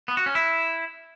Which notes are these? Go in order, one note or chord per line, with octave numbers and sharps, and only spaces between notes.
B3
F#4
C#4
E4